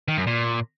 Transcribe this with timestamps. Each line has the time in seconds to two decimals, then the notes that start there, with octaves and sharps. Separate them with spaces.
0.08 D#3
0.17 F#2
0.27 A#2